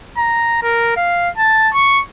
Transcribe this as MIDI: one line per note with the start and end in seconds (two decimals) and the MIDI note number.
0.17 0.60 82
0.63 0.95 70
0.96 1.30 77
1.37 1.69 81
1.74 2.02 85